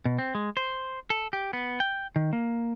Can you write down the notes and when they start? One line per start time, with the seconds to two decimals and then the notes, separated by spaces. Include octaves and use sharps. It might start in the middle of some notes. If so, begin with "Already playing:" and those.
0.05 B2
0.19 C4
0.35 G#3
0.57 C5
1.10 A4
1.33 G4
1.53 B3
1.80 G5
2.16 D#3
2.33 A#3